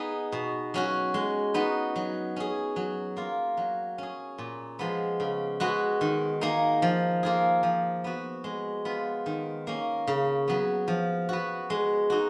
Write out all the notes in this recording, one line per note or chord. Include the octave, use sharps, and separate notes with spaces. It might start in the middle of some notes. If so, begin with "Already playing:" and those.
Already playing: B3 D#4 G#4
B2
F#3 C#4 F#4
G#3
B3 D#4 F#4
F#3
C#4 G#4
F#3
A#3 F4
F#3
C#4 G#4
A#2
F3 G#3 B3
C#3
G#3 B3 F#4
D#3
A#3 D#4 G#4
F3
A#3 F4 G#4
F3
B3 F#4
G#3
B3 F4
D#3
A#3 C#4
C#3
F#3 B3
F3
B3 F#4
G#3
D#4 F#4